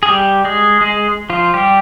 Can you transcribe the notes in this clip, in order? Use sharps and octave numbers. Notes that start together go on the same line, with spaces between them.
G#4
G3 G4
G#3 G#4
G#3 G#4
F3 F4
G3 G4